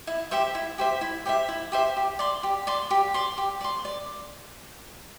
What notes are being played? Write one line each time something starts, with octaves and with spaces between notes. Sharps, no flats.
E4
G4 C5 E5
E4
G4 C5 E5
E4
G4 C5 E5
E4
G4 C5 E5
G4
D5 C6
G4
D5 C6
G4
D5 C6
G4
D5 C6
D5